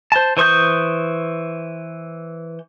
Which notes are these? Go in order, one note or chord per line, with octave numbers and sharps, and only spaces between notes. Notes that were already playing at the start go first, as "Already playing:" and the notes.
C5 A5
E3 C5 C#6 D#6 G6